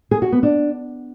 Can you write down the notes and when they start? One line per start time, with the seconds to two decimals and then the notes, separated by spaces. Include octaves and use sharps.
0.11 G#4
0.22 F#4
0.32 B3
0.43 D4